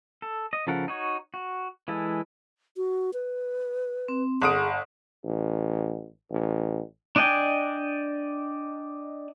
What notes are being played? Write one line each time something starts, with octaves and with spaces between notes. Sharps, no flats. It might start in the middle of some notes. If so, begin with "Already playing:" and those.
A4
D#5
C#3 F3 A4 A#4 F#5
D#4 F#4 C#5
F#4
E3 G#3 E4 A4
F#4
B4
C4
G1 G#4 F#5 D#6 D7
A1
A1
D4 D5 D#5 G5 G#5